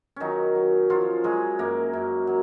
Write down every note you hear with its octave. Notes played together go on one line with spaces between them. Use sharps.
D#3 F#3 C#4 D#4
F#3
F3 F#3 F4
F#3 G#3 G#4
F#2 A#3 A#4
F#2
F#3